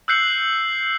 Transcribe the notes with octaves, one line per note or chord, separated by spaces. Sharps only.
E6 F#6 G6 C7 C#7 F#7